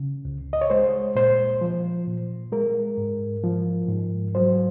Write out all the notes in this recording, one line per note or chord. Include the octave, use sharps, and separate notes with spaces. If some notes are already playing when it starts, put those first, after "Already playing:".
Already playing: C#3
C#2
D#5
C#5
G#3 C5
A#2 C5
F3
A#2
G#3 A#4
G#2
F3
G#2
F#3 C5